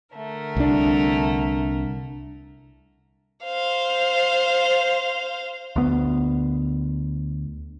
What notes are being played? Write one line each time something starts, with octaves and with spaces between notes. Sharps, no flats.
D3 A3 A#4
C2 D4
C5 F5
D2 B3